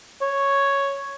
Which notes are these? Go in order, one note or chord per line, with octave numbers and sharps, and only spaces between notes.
C#5